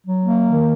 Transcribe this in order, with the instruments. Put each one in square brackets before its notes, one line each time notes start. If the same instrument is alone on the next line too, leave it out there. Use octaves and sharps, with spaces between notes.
[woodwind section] F#3
A#3
D#3